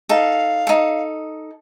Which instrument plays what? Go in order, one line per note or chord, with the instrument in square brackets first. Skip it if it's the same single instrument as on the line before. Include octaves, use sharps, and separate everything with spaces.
[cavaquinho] D#4 A4 [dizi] F5
[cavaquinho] D#4 A4